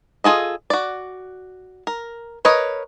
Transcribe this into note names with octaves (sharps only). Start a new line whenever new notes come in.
F4 G#4 A4 D#5
F#4 D5
A#4
A#4 B4 C#5 D#5